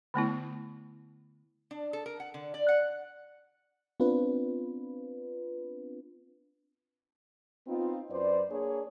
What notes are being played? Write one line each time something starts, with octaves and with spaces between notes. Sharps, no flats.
D3 A3 B3 E4
D4
A4
A#4
F#5
D3
D5
F#5
B3 C4 D4 F4 B4
B3 C4 D#4 F4
F#2 B4 C5 D5
A#3 D4 G#4 C#5